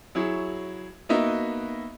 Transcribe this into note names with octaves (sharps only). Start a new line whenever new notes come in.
F#3 E4 G#4 C#5
A#3 B3 D#4 F#4 D#5 E5